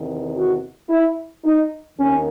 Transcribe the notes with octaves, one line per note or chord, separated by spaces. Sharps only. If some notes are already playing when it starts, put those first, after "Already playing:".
Already playing: E2 C3 D#3
F#4
E4
D#4
D#2 D#3 C#4